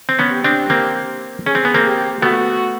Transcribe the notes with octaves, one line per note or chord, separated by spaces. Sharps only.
C4
B3 C#4
G4
C4 D4
A#3 C4
C#4 G#4
C4
B3
A#3 C4
G4
A3 B3 F#4